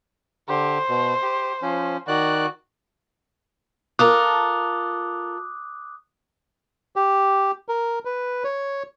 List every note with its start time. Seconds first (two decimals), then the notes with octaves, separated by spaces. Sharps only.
0.49 D3 G4 C5
0.89 B2
1.22 G4
1.62 F3 C#4
2.08 D#3 F#4 D5 F#6
3.99 F4 A4 A#4 D6 D#6 F#6
6.96 G4
7.68 A#4
8.05 B4
8.44 C#5